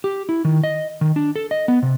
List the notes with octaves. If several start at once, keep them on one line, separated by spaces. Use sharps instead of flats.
G4
E4
D#3
D#5
D#3
D4
A4
D#5
B3
C3